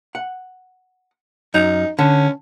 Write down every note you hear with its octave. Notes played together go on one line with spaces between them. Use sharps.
F#5
F#2 D#4
D3 C#4